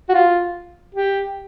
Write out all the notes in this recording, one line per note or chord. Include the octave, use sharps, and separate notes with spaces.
F#4
F4
G4